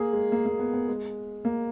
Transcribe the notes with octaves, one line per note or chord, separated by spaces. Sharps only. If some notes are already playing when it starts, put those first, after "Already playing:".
Already playing: A#3 G#4
G#3
A#3
A#3
B3
B3
G#3
A#3